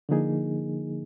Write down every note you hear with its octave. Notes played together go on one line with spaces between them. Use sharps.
D3 F3 A#3 D#4 G#4